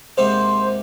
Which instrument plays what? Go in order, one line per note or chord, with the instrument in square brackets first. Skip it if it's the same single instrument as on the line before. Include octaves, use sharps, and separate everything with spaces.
[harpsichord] D#2 G#2 C3 [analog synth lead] C5